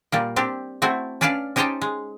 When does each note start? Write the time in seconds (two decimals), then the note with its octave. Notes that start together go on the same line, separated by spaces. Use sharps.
0.12 A#2 G3 A#3
0.36 C4 D4 G4
0.82 A3 C4 E4 F#4
1.21 C#4 D4 B4 D5 F5 A5
1.56 C#4 D#4 G4 C5 G5 A5
1.81 G#3